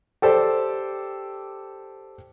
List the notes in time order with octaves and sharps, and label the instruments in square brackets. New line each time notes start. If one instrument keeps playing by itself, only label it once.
[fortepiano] G4 A4 C5 D5